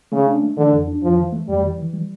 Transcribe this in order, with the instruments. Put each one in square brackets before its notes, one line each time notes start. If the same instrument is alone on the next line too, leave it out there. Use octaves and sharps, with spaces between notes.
[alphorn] C#3 [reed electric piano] A3
[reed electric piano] D4
A3
[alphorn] D3 [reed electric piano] E3
[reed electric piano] F2
D4
[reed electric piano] F2 [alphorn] F3
[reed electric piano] E3
A3
[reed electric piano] F2 [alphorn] G3
[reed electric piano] E3
E3
G3